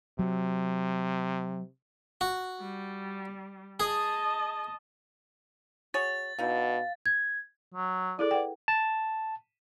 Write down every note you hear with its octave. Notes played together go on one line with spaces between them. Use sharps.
C3 F#3
F#4
G3
G#4 D#5 A5
F#4 G#4 C#5 A6
B2 D3 D#4 E4 F5
G#6
F#3
E4 G#4 A4 D5
B4 F#5 G5
A5